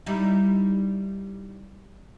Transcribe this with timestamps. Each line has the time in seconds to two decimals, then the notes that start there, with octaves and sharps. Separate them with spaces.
0.06 G3 D#4 E4